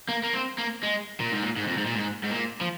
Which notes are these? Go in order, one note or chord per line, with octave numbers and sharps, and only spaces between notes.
A#3
A#3
C4
A#3
G#3
A#2
G#2
A#2
G#2
F2
G#2
A#2
G#2
G#2
A#2
F3